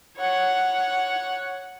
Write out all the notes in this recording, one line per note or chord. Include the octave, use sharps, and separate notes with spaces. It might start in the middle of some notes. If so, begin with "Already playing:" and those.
C#5 F#5